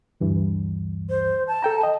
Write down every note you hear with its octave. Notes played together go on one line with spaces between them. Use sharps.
D2 G2 E3
C5
A5
A4 G5 A#5
D#5